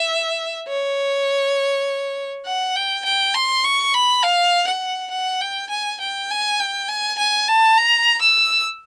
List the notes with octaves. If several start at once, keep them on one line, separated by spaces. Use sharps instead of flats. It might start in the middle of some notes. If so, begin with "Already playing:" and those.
Already playing: E5
C#5
F#5
G5
G5
C6
C#6
B5
F5
F#5
F#5
G5
G#5
G5
G#5
G5
G#5
G#5
A5
A#5
E6